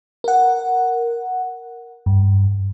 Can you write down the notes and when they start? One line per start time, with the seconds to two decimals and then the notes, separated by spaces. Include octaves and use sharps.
0.24 A#4 F#5
2.06 G2